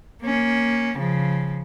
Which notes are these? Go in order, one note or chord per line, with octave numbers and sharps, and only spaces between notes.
A#3 C#4
C#3 F3